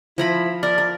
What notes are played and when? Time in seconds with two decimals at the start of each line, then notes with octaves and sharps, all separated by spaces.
0.18 F3 E4 A#5 B5
0.63 A#4 D5
0.78 A#4